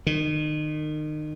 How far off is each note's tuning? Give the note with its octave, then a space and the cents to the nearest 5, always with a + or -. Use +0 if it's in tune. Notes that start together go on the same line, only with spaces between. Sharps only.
D#3 -30